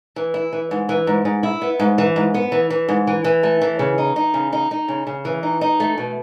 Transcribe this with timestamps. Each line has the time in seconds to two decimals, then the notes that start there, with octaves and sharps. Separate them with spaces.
0.16 E3
0.34 E4
0.53 E3
0.71 G#2
0.89 E3
1.07 G#2
1.25 G#2
1.43 E4
1.62 B3
1.80 G#2
1.98 E3
2.16 G#2
2.34 B3
2.52 E3
2.70 E3
2.89 G#2
3.07 E3
3.24 E3
3.43 A3
3.61 E3
3.79 C#3
3.98 D#4
4.16 D#4
4.34 C#3
4.53 D#4
4.71 D#4
4.88 C#3
5.07 C#3
5.25 E3
5.43 D#4
5.61 D#4
5.80 A3
5.98 B2